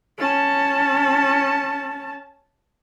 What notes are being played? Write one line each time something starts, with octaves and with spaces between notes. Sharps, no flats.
C#4 A5